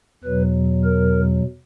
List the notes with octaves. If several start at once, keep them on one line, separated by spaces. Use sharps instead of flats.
E2 B2 F#3 B4
A#4